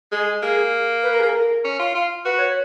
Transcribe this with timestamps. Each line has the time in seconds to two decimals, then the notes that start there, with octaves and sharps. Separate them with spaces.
0.12 G#3 G#4
0.42 A#3 G#4
1.03 B4
1.12 A#4
1.20 G#4
1.29 A#4
1.64 C#4
1.79 F4
1.95 F4
2.25 F#4 B4
2.39 C#5